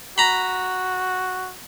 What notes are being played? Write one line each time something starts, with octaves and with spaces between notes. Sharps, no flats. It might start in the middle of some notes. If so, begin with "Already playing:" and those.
F#4 A#5 B5